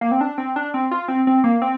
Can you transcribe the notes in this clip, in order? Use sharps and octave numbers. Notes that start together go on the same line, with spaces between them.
A#3
C4
D4
C4
D4
C4
F4
C4
C4
A#3
C4